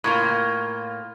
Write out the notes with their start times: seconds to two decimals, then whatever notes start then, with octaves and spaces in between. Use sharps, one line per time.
0.04 A2 A#3 F4